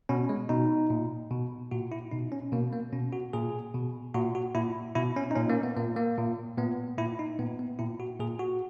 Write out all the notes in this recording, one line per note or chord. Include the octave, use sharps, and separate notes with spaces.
B2 C#4
G#3
B2 D#4
A#2
B2
A#2 F#4
E4
B2 D#4
C#4
B2 A#3
A#3
B2 C#4
F#4
A#2 G#4
B2
A#2 F#4
F#4
A#2 E4
B2 E4
C#4
D#4
A#2 C#4
A#3
B3
A#2 A#3
A#3
A#2
A#2 B3
A#2 E4
D#4
A#2 B3
B3
A#2 E4
F#4
A#2 G#4
F#4